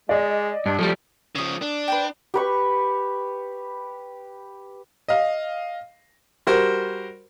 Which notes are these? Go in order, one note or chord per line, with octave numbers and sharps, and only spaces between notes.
G#3 D5 D#5
G2 D4
F3 G3 A3
C#3 F3 D5 D#6
D4
B4 C5 G5
G4 B4 C#6
D#5 F5
G3 F#4 A#4 C5